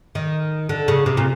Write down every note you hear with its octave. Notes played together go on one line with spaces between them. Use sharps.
D#3
D3
C#3
C3
A#2